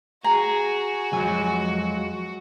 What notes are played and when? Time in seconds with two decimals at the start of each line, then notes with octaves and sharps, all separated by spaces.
0.24 F#4 G#4 A#5
1.13 F2 F#3 G#3 G#5